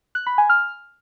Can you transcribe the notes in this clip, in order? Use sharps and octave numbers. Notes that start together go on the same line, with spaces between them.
F#6
B5
G#5
F6